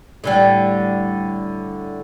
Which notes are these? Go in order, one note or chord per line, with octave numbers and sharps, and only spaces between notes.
A2 D3 G3